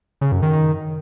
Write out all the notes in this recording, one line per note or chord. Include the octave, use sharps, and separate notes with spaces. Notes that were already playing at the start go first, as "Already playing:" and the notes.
C#3
F#2
D#3
D#3